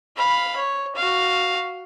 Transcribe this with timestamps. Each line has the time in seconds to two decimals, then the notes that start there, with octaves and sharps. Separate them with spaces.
0.16 F5 B5
0.56 C#5
0.95 F#4 F5